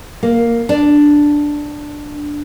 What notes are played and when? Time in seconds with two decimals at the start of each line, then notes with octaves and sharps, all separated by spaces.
0.23 A#3
0.69 D4